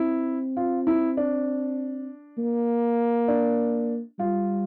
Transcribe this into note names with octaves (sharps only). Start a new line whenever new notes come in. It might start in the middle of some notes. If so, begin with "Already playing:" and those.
Already playing: C4 E4
F4
E4
D4
A#3
D4
G3 F4